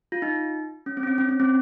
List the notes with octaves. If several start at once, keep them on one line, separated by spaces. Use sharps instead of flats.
F4
D#4
C#4
C4
C#4
C4
C#4
C#4
C4